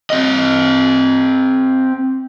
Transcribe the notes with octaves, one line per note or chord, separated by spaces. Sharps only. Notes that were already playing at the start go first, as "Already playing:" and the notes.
C4 D#5